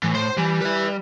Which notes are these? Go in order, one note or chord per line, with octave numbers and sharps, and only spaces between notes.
A2 E3
C5 C6
E3 G3
B4 E5